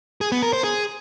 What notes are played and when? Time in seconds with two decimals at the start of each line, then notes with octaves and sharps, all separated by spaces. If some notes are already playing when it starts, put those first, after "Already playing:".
0.21 G#4
0.32 B3
0.43 A#4
0.53 C5
0.64 G#4